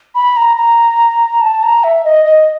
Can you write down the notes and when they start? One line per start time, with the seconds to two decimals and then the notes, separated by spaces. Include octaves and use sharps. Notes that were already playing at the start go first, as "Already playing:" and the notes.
0.15 B5
0.37 A#5
0.57 A#5
1.41 A5
1.63 A#5
1.84 E5
2.04 D#5
2.25 D#5